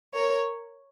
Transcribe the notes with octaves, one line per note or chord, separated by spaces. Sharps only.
A#4 C#5